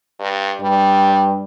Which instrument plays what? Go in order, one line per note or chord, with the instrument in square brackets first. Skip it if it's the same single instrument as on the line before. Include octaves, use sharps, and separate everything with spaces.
[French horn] G2
[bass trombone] G2 [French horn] G3